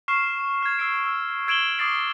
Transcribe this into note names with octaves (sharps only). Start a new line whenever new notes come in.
C#6 F6 C7 E7
F6 G#6
E6 C7 D7
E6
E6 G#6 D7 E7 F#7 G7
D6 D#6 A6 C7 D7